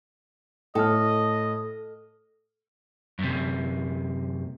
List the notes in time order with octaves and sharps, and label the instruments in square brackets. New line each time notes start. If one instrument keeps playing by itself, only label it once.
[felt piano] A2 F6 [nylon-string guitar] A4 [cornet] D#5
[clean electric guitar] F#2 C3